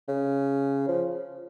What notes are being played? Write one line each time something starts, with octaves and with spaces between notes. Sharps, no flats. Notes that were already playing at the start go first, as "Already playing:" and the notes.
C#3
F3